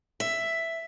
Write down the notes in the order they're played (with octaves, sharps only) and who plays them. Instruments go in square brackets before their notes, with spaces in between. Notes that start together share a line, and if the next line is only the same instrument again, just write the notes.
[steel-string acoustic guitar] E5